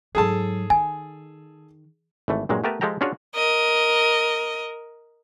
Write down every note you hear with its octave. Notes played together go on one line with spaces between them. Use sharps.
G#2 F#3 G#4 A4 A5
D#3 G#5
G#1 E3 A3
G2 A#2 F#3 G#3
A3 B3 G4 A#4 B4 A5
F3 G#3 G4 A4 G5 A#5
C#4 D4 F4 F#4 G#4 C#5
A#4 D#5